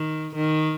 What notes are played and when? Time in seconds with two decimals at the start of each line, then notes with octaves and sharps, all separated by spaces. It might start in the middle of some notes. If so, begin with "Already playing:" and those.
Already playing: D#3
0.35 D#3